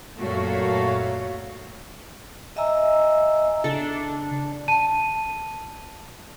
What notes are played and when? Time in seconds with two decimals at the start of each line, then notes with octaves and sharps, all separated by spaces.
0.19 F#2 A#2 A3 F#4 C#5 F5
2.56 D#5 E5 G#5 A#5 E6
3.64 C#3 D4 A4
4.68 A5 D#7